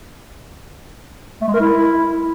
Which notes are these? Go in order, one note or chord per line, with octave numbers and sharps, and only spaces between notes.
A3
G#3
A#4
E4